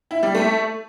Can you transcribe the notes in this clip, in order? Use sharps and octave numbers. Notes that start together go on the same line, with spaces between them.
E4
G3
A3